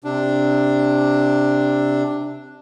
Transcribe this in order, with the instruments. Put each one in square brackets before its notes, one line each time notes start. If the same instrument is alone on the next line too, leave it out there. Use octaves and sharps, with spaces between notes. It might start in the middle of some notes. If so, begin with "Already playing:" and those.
[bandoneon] C3 D4